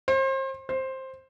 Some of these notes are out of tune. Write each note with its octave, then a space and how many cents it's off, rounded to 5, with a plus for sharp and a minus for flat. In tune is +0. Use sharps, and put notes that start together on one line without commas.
C5 +35
C5 +10